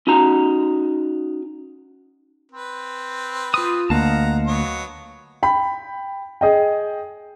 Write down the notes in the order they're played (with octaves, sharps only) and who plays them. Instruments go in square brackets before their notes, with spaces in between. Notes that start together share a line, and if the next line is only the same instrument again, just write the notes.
[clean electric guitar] C#4 D#4 F#4 A#5
[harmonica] C4 B4
[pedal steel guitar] F4 D#6
[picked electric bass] D2 A#3 [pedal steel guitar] D#5 F5 A5 [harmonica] F#5 A#5
[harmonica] F#3 B3 C#5
[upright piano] G5 B5
G#4 D#5 G5